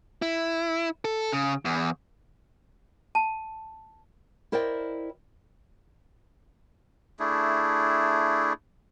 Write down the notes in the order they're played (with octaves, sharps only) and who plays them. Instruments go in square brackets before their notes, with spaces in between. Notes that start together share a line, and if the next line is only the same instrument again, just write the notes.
[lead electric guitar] E4
A4
C#3
E2
[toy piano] A5
[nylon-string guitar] E4 A#4 C5 D5 D#5 G5
[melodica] A3 D4 E4 G#4